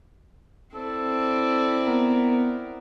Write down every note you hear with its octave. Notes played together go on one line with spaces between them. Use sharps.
C4 E4 A4 D5
B3 A#4